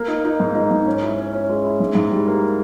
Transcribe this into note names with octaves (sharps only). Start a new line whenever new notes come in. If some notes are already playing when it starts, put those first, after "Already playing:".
Already playing: A#3
D#4
D#4
G#2
D#4
G#2
C#4
E4
C#4
C#4
G#3
E4
G#2
G#2
G3
A#3